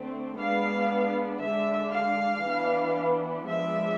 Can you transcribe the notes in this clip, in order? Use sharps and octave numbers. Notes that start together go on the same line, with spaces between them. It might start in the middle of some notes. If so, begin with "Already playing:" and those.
Already playing: D3 A3 C4
G#3 B3 D4 F5
D3 G#3 D4 E5
F5
E3 B3 D4
F3 G#3 B3 D4 E5